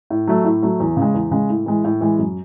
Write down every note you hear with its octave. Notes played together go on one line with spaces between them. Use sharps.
A2
F#3 A3
A2
F#3 A3
E2
C#3 G#3
E2
C#3 G#3
A2
E3 G#3
A2
E3 G#3
F#2